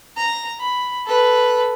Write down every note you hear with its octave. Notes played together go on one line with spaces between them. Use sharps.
A#5
B5
A4 B4